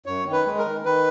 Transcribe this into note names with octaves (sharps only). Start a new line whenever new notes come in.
F#2 C#5
D#3
B4
G#3
A#4
D#3
D#3 B4